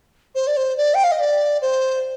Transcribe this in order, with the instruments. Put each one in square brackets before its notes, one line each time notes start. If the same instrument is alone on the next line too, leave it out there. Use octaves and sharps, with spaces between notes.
[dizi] C5
D5
C5
D5
G5
F5
D#5
D5
C5